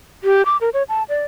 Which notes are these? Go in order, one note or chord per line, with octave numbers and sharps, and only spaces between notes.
G4
D6
A#4
C#5
A5
D5